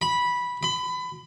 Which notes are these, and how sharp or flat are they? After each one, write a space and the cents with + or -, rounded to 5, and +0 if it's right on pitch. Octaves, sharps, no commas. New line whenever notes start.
B5 -10
B5 +25